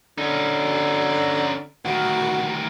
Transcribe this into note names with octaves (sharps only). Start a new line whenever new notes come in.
D3 C#4 D#4
D2 D#3 F#4